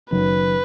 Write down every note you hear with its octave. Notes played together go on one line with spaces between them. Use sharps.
F#1 F#2 D#3 F#3 B4